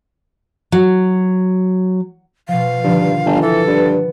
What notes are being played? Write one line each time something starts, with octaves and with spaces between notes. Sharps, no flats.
F#3
B2 F3 F5
G2 D3 D#3 F3
G1
E3 A4 B4
G2 B3